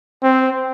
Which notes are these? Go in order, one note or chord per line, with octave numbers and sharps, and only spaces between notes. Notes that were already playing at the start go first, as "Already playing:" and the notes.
C4